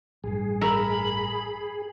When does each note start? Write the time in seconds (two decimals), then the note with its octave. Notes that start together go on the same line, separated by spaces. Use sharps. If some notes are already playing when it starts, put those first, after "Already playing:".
0.24 A1 G2 G#4
0.61 A#4 E5 B5